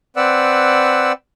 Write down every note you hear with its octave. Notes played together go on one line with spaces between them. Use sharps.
C4 B4 D5 F#5 E6